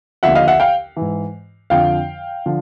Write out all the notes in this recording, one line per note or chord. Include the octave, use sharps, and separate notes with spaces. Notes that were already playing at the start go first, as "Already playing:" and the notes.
D#2 D3 F3 E5 F#5
D#5 F5
E5 F#5
F5 G5
G#2 E3
F2 D3 F3 F5 G5
D3 F3